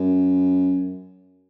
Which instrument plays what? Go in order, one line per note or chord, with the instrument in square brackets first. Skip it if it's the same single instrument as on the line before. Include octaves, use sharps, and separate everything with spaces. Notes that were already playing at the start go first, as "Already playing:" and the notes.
Already playing: [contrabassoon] F#2